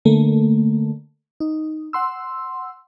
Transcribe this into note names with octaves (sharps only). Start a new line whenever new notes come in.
D3 A3 A#3
D#4
F#5 C6 E6